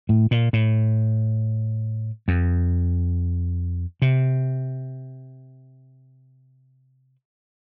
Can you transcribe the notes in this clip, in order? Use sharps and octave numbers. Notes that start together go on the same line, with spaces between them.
A2
A#2
A2
F2
C3